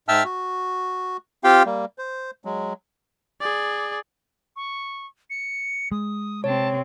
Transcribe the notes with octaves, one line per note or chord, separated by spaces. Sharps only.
G#2 E5 G5 A5 E6 F6
F#4
C4 F4 G4 F5 G5
G3 A#3
C5
F#3 G#3
G#4 D5
C#6
C#7
G#3 D#6
C3 C4 C#5 A5